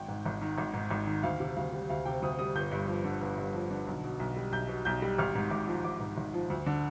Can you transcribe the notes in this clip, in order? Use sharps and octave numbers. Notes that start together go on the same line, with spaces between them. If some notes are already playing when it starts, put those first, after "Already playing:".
Already playing: G#1 G5
G#2
G#1
D#3
G#1
G#2
G#1
D#3
D2 F5
C3
D2 F5
G3
D2 F5
C3 G5
D2 D#6
G3 D#6
G1 G6
G2
F3
D3
G1
G2
F3
D3
B1
B2
B1
G3
B1 G6
B2
B1 G6
G3
G#1 F6
G#2
G#1 D6
F3
G#1 D6
G#2
G#1
F3
D2
D3